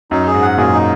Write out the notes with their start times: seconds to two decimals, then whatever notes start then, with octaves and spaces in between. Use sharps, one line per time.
0.11 F#2 D#4
0.26 G#4
0.34 G#2
0.42 F#5
0.57 F#2 A#2 G#4
0.73 D#4